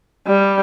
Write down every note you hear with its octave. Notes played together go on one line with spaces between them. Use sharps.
G3